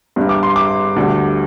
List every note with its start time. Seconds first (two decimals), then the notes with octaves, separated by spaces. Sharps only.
0.16 G1 G2 G3
0.29 D6
0.43 C6
0.56 D6
0.96 D2 D3 G3